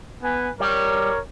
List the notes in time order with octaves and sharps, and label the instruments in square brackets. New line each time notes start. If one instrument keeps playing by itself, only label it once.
[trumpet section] B3 B4 G#5
[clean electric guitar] G3 [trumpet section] A#4 C#5